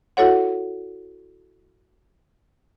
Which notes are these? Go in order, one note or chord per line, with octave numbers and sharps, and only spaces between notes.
E4 F#4 A4 C#5 F#5